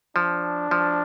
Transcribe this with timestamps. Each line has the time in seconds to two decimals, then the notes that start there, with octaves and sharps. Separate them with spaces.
0.16 F3 D4
0.71 F3